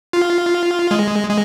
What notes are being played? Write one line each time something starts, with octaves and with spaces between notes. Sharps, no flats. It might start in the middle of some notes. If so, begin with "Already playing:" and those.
F4
G#3
G#3